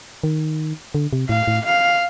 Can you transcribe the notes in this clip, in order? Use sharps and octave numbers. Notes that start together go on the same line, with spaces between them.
D#3
D3
C3
A2 F5
A2
F5